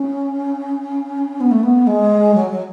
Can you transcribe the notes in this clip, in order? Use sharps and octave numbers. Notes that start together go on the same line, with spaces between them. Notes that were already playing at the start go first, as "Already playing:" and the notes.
Already playing: C#4
B3
A3
B3
G#3
F#3
F#3